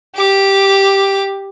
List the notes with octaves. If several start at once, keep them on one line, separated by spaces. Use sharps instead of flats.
G4 D6